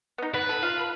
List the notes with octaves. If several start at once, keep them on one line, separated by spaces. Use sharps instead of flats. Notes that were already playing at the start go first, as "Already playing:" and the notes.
B3 D#4
B3 B4
A4
F4 F5